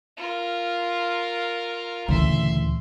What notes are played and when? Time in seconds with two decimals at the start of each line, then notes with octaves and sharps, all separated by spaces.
0.17 F4 A#4
2.08 D2 A#2 C#3 E3 E5 C6